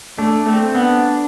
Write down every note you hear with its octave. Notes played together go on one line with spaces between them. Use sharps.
A3 D4
A3 C4
B3 D4